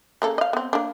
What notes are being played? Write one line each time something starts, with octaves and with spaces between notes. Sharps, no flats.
C#3 A#3 A4
D#5 F5
B3 C4
A#3 D4